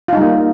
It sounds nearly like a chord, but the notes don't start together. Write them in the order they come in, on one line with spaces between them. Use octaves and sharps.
F4 D#4 G3 A#3